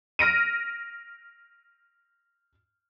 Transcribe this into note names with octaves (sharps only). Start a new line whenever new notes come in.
F6 A#6 D7 D#7